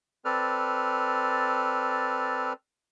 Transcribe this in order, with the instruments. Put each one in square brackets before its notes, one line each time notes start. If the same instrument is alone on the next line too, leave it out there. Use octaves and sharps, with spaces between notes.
[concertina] C4 A4 B4 D5 F6